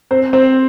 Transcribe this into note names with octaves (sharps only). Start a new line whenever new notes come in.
C4 C5
C4 C5